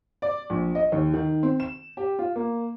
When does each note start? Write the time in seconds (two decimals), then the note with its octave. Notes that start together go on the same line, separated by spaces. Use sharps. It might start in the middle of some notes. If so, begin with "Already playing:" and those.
0.22 D5
0.50 A#1
0.75 D#5
0.92 D#2
1.14 D#3
1.43 C4
1.60 E7
1.97 G4
2.19 F4
2.36 A#3